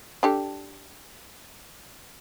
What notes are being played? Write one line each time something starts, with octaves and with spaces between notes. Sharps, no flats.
D4 G4 A4